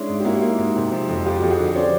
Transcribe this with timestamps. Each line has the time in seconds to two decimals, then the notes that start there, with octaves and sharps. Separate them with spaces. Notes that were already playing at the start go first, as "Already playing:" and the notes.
Already playing: G#3 C#4 D4 E4
0.09 G#2
0.20 G4
0.25 A#3 E4 F#4
0.42 A#3
0.58 G#2
0.76 C3
0.92 F3
1.09 F2
1.25 F2 F4 G4
1.37 F#4
1.43 F2 G4
1.50 F#4 G#4
1.59 D3
1.76 C#4 C5 D5